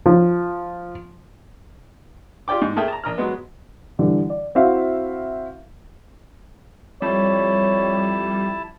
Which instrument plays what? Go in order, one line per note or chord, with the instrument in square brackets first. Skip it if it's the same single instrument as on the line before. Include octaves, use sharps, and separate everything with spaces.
[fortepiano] F3
F4 G4 D5 G5 D6
G#2
A3 G#4 A#4 E5 G5 A5
A5 A#5
A#1 A#5 F6
F#3 G#3 B3
[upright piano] D3 E3 G3
D5
C4 E4 F#4 E5 F5
[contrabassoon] F2 [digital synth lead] G3 [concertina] E4 A5 [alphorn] C#5